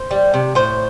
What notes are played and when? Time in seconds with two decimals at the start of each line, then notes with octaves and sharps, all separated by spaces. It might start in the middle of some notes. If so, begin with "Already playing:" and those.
Already playing: C5
0.11 G3
0.34 C3
0.55 A2 C5